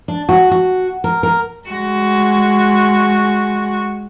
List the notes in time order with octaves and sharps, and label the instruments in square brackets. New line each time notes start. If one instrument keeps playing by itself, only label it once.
[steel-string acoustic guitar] D4
F#4
F#4
A#4
A#4
[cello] G#3 F#4